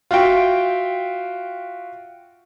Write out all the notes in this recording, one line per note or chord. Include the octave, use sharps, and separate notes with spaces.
F4 F#4 E5 G5